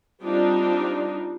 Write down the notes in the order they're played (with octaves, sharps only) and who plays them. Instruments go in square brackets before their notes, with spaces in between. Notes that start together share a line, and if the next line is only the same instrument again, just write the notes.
[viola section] G3 C4 D4 D#4 F4